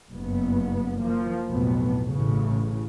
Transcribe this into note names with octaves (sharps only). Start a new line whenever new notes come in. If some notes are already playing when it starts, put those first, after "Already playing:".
F#1 G2 B3
F3 A#3
B1 F2 A2 B3
A1 A2 C#3